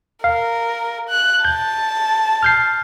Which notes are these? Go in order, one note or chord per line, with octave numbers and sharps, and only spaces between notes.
A#4 F5
F#6
A5 G6
F6 G6 C7